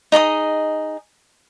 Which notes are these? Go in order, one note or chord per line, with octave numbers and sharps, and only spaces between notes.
D#4 G#4 D#5 D#6